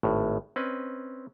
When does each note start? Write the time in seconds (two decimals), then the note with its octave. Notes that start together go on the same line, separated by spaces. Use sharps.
0.03 G#1 A2
0.56 C4 C#4 B4 D#5